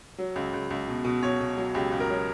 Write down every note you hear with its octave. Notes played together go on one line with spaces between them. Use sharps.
F#3
C#2
C#2
C#2
B2
B2
B2 C#5
B2
F#3
C#2 G4
C#2
A#4
F#3